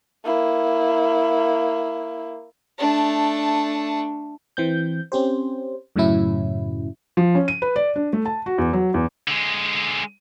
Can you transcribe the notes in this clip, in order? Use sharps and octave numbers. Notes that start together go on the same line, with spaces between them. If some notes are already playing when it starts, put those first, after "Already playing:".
A#3 E4
A3 D4
E3 C4 G6
C4 C#4 G4 C5
F#2 A2 C#3 F#3 C#4 E4
F3
C#4
D#7
B4
D5
D4
A3
A5
F#4
E2
F#3
E2
D3 G#3